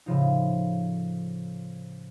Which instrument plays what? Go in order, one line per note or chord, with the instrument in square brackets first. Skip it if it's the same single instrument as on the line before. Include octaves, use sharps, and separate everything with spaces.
[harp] A2 C#3 F3 D#4